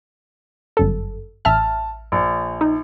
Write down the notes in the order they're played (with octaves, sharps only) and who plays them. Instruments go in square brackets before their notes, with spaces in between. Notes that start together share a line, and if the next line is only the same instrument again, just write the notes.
[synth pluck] G1 F#2 A4
[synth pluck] A1 E5 F6 [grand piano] A5
[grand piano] A#1
[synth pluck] D#4